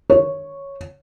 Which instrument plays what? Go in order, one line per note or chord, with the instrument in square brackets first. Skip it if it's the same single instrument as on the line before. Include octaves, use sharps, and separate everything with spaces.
[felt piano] C#5